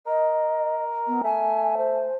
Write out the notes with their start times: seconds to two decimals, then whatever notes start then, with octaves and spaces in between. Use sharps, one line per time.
0.07 A#4 D#5
1.08 B3
1.24 A3 G#5
1.78 C5